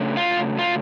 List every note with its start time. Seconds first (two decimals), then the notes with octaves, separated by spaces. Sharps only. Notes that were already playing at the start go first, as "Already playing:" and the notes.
Already playing: C#3 F#3 A3 D4
0.17 F4
0.59 F4